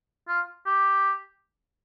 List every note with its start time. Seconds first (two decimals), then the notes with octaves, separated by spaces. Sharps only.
0.28 F4
0.66 G4